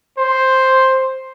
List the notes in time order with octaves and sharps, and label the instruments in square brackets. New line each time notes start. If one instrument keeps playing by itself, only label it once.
[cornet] C5